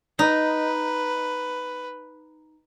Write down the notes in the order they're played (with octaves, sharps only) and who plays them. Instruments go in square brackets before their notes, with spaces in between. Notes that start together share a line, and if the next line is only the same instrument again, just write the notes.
[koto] D#4 [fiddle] B4